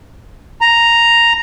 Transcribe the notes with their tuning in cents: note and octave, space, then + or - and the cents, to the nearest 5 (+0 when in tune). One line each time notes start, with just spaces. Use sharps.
A#5 +0